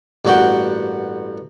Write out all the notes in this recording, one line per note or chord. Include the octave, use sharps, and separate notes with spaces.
A1 G2 A#3 F#4 F#5 G5